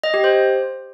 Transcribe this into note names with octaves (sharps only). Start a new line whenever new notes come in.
D#5
G4
C5